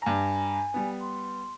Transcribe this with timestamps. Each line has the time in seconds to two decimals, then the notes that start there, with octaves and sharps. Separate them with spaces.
0.02 G2 G#5 A#5
0.74 G3 B3
1.01 C6